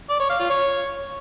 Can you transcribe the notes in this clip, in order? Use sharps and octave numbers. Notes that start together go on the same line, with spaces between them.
D5
C#5
F5
F4
C#5